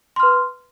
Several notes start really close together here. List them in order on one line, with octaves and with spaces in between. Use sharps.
C6 F6 B4